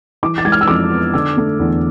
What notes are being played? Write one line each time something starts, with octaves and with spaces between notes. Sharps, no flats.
E3 D6
A6
G#3 G#6
F6
E6
F2 D6
B3
D3 E6
A3
E2